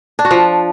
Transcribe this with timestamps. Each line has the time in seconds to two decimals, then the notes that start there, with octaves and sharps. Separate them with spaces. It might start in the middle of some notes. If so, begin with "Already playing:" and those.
0.19 D4
0.25 F#4
0.31 F3